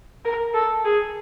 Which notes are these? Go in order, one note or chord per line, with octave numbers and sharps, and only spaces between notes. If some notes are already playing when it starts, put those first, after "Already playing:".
A#4
A4
G#4